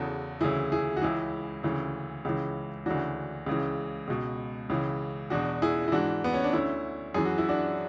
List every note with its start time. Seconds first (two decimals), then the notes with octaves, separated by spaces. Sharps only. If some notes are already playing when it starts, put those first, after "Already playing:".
Already playing: E2 C#3 E3 F#4 A4
0.41 D2 C#3 E3 E4 G#4
0.72 E4 G#4
0.96 F#4
1.01 C#2 C#3 E3 E4 G#4
1.63 D2 C#3 E3
2.25 C#2 C#3 E3
2.86 D2 C#3 E3 D4 F#4
3.46 C#2 C#3 E3
4.08 C#2 B2
4.70 C#2 C#3 E3
5.30 E2 B2 D4 F#4
5.62 E4 G#4
5.88 E4
5.92 G#2 E3 D4 F#4
6.24 B3
6.34 C#4
6.44 D4
6.53 D2 D3 C#4 E4
7.14 F#2 E3 G#4
7.25 F#4
7.38 E4
7.49 D4 F#4